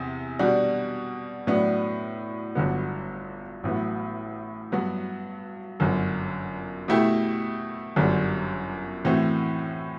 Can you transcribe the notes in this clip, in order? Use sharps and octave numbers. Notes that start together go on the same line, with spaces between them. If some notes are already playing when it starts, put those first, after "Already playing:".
Already playing: E2 C3
B2 G3 D4 F#4
A2 F#3 B3 D4
G1 G2 D3 F#3 B3
A1 A2 F#3 B3
G2 F#3 B3 F#4
G1 F#2 D3
B2 A3 E4 G4
G1 F#2 D3 G3
A2 E3 A3 C4 F#4